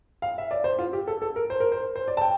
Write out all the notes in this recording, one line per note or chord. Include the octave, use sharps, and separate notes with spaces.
F5
E5
D5
C5
F4
G4
A4
A4
A#4
C5
A#4
C5
C5
D5
A5
G5